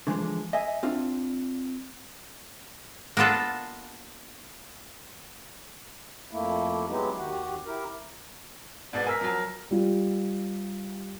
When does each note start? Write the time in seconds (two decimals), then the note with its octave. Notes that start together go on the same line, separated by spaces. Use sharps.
0.07 D3 E3 F3 G#3
0.53 D#5 E5 G#5
0.83 C4 D4 F4
3.17 A#3 B3 D4 F4 A4
6.31 F2 A3 A#3 E4
6.88 F#3 G#3 B3 D#4 E4 G4
7.18 D#2 D#3 F#4 G4 F#5
7.66 E4 G4 A#4
8.93 G#2 B2 B3 D5
9.07 A#4 G#5 E6 B6
9.21 F3 F#3
9.71 G3 F4